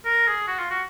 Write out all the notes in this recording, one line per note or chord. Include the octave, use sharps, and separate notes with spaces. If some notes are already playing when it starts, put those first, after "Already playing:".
A#4
G#4
F#4
F4
F#4